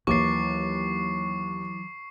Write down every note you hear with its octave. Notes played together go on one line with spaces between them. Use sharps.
D#2 E3 F#3 E4 C#6 D6 A6 C7